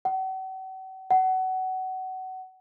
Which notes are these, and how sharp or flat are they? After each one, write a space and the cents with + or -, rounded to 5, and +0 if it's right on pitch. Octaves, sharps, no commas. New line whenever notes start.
F#5 +45
F#5 +25